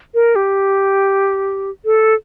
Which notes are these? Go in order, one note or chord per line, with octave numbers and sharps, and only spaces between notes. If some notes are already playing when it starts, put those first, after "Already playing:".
A#4
G4
A4